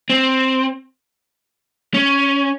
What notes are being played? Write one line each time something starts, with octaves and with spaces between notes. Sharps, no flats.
C4
C#4